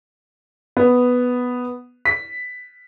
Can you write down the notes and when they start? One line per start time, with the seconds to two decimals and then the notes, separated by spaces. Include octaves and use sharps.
0.77 B3
2.05 B6